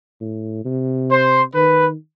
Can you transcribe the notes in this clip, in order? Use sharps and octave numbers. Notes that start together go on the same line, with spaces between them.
A2
C3
C5
D#3 B4